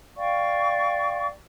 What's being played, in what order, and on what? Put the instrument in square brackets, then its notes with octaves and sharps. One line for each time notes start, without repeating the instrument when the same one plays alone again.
[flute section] D5 F5 G5 C#6